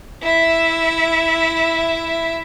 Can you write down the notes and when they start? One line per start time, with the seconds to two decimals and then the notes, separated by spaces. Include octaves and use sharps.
0.22 E4 E5